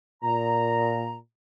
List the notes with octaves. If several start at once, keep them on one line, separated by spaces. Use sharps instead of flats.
A#2 A#5